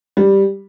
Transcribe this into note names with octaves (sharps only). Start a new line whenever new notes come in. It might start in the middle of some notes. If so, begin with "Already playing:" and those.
G3